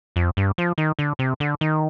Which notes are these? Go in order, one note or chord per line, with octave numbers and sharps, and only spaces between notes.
F2
G2
F3
D#3
D3
C3
D3
D#3